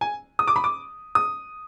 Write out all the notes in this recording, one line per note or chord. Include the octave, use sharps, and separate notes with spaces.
G#5
D#6
D6
B5
D6
D#6